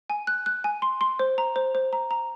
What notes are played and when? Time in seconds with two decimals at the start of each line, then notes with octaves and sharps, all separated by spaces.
0.10 G#5
0.27 F#6
0.46 F#6
0.64 G#5
0.82 C6
1.01 C6
1.19 C5
1.38 A#5
1.56 C5
1.75 C5
1.93 A#5
2.11 A#5